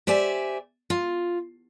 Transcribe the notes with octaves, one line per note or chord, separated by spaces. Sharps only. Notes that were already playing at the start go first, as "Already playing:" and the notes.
G4 C5 D5 E5 G#5
F4